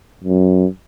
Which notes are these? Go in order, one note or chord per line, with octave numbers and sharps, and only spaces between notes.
F#2